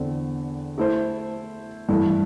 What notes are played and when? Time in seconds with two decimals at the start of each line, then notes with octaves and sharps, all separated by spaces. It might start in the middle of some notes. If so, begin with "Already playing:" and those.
Already playing: E2 D3 C4
0.78 A3 E4 C5
1.89 G2 E3 A3 E4